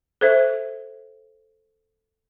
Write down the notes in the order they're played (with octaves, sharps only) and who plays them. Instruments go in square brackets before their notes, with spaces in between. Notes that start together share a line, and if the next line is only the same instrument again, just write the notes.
[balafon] A4 C5 E5